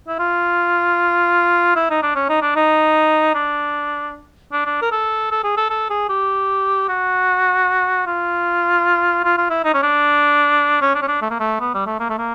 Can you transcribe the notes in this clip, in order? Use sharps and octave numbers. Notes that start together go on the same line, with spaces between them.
E4
F4
E4
D#4
D4
C#4
D#4
D4
D#4
D4
D4
D4
A#4
A4
A4
G#4
A4
A4
G#4
G4
F#4
F4
F4
F4
E4
D#4
C#4
D4
C#4
D4
C#4
D4
A3
A#3
A3
B3
G3
A3
A#3
A3
A#3